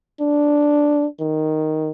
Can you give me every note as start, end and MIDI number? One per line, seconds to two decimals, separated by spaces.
0.21 1.06 62
1.20 1.91 51